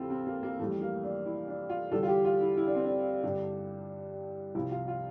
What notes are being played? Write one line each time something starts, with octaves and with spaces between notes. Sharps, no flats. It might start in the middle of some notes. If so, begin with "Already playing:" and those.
Already playing: D2 C3 E3 C4 E4 F4 G4 A4
C4
A#3
A#3
F2 E3 G3 A3
A#3
D4
E4
D4
F4
E2 D3 G3 A4
F4
G4
F4
E4
E4
D4
C4
D4
G2 D3 G3
C2 C3 F3 E4
F4
F4